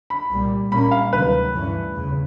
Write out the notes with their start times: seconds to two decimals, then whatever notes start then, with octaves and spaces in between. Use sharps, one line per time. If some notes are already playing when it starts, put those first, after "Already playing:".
0.10 B5
0.30 C2 A#2 G3
0.72 A#2 G3 A#3 C#4 B5
0.91 F5
1.13 D2 C3 D#3 F#3 B4
1.53 G2 E3 A3 C#4
1.94 E2 C#3